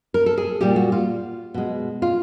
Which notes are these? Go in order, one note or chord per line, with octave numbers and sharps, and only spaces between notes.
A#4
A4
G#4
A#2 G3 G4
F#4
F4
B2 G#3
F4